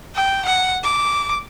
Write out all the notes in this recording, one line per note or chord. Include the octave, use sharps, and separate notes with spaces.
G5
F#5
D6